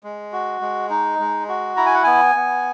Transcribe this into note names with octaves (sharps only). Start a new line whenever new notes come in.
G#3
F#4
G#3
D#4
G#3
F#4
E4 A#5
G#5
F#5
B3 G#5
B3